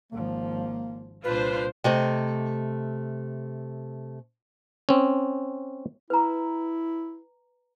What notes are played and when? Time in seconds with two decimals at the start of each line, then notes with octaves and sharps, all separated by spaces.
0.12 G#1 F3 A#3
1.24 C2 A#2 D4 F4 B4 C5
1.84 C3 A3 D#5
4.89 C4 C#4
6.10 E4 B4 A#5